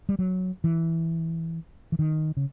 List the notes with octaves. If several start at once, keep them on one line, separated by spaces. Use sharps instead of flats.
G3
F#3
E3
E3
D#3
C#3